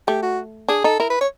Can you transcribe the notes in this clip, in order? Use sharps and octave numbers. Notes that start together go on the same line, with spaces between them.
A3 G4
F#4
D4 G#4
D#4 A4
E4 A#4
B4
C#5